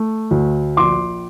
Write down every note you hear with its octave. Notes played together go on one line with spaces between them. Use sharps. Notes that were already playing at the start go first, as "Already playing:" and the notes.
Already playing: A3
D2
A#1 C6 D6